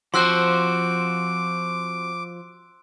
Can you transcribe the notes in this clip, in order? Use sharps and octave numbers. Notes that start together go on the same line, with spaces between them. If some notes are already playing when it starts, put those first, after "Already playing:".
F3 C4 F#4 C5 C6 D6 E6 F#6